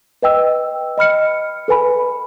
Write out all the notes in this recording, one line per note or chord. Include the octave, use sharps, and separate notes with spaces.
B4 D#5 G5 E6
D#5 B5 F6 C#7
A4 B4 G#5 B5